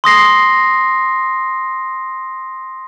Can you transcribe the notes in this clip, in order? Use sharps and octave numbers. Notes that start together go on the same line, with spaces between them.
C6 D#6 A#6 C7